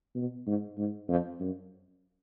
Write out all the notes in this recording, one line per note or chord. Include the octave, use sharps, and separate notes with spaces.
B2
G#2
G#2
F2
F#2